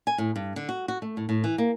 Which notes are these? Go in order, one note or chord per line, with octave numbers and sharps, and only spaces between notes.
G#5
A2
G2
D3
F#4
F#4
A3
A2
A2
E3
A#3